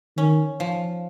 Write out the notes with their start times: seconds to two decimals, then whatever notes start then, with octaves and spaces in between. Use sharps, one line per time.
0.17 D#3 C#4
0.60 F3